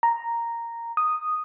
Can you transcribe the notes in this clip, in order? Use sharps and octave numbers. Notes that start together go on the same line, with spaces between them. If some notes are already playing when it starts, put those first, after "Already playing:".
A#5
D#6